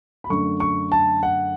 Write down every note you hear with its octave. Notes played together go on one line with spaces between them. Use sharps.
B5
F#2 D3 A3 C#6
C#6
A5
F#5